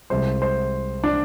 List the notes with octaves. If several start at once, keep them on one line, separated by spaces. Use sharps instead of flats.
C2 C3 G#3 C5
C5
D4